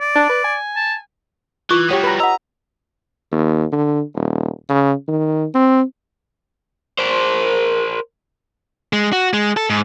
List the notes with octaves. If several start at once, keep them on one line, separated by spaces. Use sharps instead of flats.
D5
D4
B4
G#5
A5
E3 F4 C#6 D6
G3 F#4 G4 C#5 D#6
B4 A#5
D#5 F#5 A#5 E6
D#2
D3
D#1
C#3
D#3
C4
A#4 C5
G#3
F#4
G#3
A4
G#2